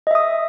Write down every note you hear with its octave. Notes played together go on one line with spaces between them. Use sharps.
D#5 E5 D#6